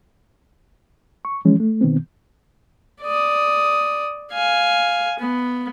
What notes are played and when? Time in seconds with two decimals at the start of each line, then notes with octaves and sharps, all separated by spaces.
1.25 C#6
1.45 E3 F3 G#3 C#4
1.60 A3
1.81 B2 D#3 B3 C4
3.02 D5 D#6
4.32 F5 G#5
5.19 B3